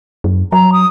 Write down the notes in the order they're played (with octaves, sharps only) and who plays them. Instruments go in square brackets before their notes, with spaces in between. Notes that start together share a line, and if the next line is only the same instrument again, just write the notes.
[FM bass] F#2
[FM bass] F#3 [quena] A#5
[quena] D#6